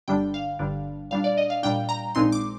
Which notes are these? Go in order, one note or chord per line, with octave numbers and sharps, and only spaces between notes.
G1 G2 D3 G3 D4 G5
F5
G1 G2 D3 G3 D4
A#2 G3 D4 F5
D5
D#5
F5
A#2 G3 D4 G5
A#5
A#1 A#2 G#3 C4 D#4 C6
D6